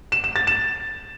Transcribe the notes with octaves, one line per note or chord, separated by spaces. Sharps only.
E7
E7
A6
E7